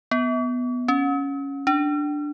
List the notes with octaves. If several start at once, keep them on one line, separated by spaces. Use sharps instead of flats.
B3
C#4
D4